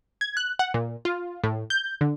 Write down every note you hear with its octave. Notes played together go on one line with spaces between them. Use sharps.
G#6
F#6
F#5
A#2
F4
A2
G6
D3